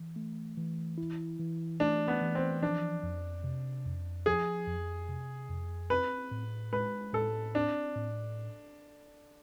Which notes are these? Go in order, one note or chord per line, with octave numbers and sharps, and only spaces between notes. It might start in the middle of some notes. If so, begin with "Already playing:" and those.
Already playing: E3
A3
E3
E4
E3
A3 D4
B3
E3
C4
F3 D4
F2
C3
F2
F3 G#4
F2
C3
F2
C4 B4
A2
G#3 B4
A2 A4
C4 D4
A2